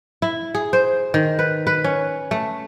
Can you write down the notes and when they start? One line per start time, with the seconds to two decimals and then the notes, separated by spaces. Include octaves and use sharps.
0.22 E4
0.55 G#4
0.73 C5
1.14 D#3
1.39 B4
1.67 B4
1.84 C#4
2.31 A3